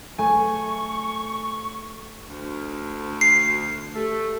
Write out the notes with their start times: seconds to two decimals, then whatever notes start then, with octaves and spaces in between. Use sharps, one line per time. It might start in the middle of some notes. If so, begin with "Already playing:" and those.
0.18 A3 G#5 C#6
2.29 D2
3.21 C7
3.95 A3 G4 A4 E6